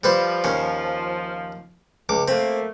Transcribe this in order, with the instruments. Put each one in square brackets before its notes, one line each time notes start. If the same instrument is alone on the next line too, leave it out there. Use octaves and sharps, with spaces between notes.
[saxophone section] F3 [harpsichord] G3 B4 C5
[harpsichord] D#2 C#4
C#2 D6
[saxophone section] A3 A#3 [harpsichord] C4